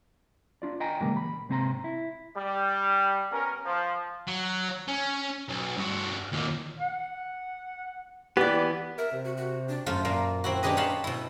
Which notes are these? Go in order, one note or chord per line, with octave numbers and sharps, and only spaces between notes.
D4 F4 D5
D#5 G5 G#5 A#5
A#2 C#3 E3 G3 G#3 A#3
B5
G#2 C3 C4 C5 A#5
E4
G3
B3 C#4 A#4
F3
F#3
C#4
B1
G2 F#4
D#2 A#2
F#5
E3 B3 G4 D5
A#4 E5
C3
F#4
F#4
D4
F#2 A3 F4 C5
A#2 A#3
C4 E4 F#4
D4 D#4 G4 G#4 B4 D#5
C#5 F5 F#5 A5 B5 C6
B2 E4